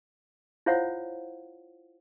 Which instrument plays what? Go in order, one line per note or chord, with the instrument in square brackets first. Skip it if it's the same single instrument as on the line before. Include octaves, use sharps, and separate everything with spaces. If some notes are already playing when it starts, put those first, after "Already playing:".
[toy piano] E4 F4 C5 C#5 F5 F#5